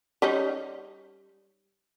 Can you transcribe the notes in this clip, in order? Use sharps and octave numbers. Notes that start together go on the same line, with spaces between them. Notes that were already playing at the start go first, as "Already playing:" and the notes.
G3 C#4 D#4